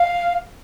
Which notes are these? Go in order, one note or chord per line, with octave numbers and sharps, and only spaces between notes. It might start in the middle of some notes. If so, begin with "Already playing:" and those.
Already playing: F5